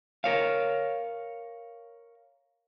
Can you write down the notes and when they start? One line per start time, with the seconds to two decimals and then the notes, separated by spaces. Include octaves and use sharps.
0.24 A#4 C#5 F5